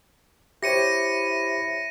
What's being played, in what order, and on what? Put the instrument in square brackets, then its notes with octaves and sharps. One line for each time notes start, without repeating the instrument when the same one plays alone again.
[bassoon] E4 [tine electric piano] G4 C5 C#5 [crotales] A#6 C#7 D#7